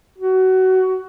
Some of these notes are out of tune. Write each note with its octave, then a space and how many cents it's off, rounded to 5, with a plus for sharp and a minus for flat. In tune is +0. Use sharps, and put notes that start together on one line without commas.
F#4 +20